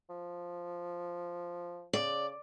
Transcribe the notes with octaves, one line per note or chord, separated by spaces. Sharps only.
F3
C#3 D5